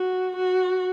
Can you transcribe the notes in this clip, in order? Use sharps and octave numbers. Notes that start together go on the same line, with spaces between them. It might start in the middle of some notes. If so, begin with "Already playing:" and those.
Already playing: F#4
F#4